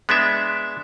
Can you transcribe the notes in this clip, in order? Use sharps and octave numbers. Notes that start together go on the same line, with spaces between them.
G#3 B3 D4 E5